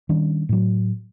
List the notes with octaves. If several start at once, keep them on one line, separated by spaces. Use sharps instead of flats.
D#3 G3 C#4 D4
A2 F#3